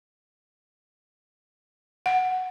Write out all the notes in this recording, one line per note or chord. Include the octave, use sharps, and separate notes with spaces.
F#5